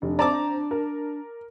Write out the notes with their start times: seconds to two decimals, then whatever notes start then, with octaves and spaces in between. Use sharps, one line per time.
0.02 F1 D4
0.19 C4 D5 A5 A#5 D6
0.71 A#4